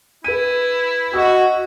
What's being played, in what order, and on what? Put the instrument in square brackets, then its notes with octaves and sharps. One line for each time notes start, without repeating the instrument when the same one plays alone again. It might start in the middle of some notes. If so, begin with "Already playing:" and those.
[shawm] E4 [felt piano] B4 D#7
[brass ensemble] F#4 [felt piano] D#5 E6